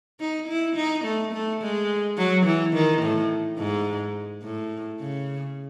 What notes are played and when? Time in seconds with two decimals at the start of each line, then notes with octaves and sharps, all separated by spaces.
0.20 D#4
0.48 E4
0.76 D#4
1.05 A3
1.33 A3
1.61 G#3
2.17 F#3
2.46 E3
2.73 D#3
3.02 A2
3.58 G#2
4.43 A2
4.99 C#3